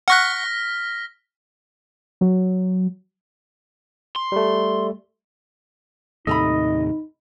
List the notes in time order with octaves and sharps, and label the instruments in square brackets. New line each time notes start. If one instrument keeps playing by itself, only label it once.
[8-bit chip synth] F#5 C#6 F#6 [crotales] F6 A#6 B6
[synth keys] F#3
[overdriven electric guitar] C6
[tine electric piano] G3 A3
[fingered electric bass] D#2 A2 C3 [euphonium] D#4 [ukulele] A4 A#5 B5 [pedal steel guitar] D#5